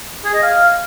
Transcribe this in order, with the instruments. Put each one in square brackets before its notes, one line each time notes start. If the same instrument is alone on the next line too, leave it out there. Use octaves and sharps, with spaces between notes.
[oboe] G#4
D#5
F5